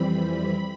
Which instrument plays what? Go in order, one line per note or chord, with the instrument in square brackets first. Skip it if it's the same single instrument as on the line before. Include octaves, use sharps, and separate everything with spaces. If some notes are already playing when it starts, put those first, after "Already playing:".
Already playing: [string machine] F2 E3 G3 C4 B5